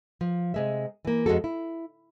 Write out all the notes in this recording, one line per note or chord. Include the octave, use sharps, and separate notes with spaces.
F3
C3 G#3 E5
E3 A#3
F2 G#3 D#4 F#4 A4
E4